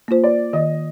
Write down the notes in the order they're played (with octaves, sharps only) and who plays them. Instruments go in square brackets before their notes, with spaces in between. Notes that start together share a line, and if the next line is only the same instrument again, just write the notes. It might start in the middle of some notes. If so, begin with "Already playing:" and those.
[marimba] A#3 F4 C5
[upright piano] D5
[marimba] D#3 [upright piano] D#5